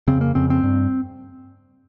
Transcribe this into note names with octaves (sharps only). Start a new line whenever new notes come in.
F2 C#3 C4
A#3
F2 C#3 C4
C4
G2